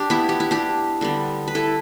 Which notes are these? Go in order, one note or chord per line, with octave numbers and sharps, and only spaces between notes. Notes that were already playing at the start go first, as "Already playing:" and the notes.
Already playing: D4 G4
B3 E4
G4
E4
D4 G4
D3 G3 B3
B4
E4 A4